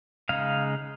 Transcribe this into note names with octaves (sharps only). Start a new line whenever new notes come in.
C#3 G#3 D#4 F5